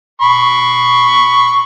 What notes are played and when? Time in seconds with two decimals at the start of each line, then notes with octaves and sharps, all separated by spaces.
0.21 B5 C#6